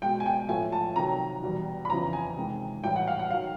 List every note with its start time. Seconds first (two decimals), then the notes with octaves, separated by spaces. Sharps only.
0.02 B2 G#3 G5
0.20 G#5
0.26 G5
0.49 A2 F3 A3 G#5
0.72 A5
0.96 C3 D#3 F#3 A#5
1.43 E2 B2 G3
1.85 B5
1.90 F2 C#3 E3 A#5
2.13 G#5
2.37 C3 D#3 G#3
2.83 A2 E3 G3 G5
2.96 F#5
3.08 F5
3.19 F#5
3.31 D#3 F#3 F5